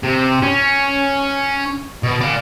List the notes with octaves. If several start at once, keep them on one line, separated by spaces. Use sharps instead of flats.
C3
C#4
B2
D5 F5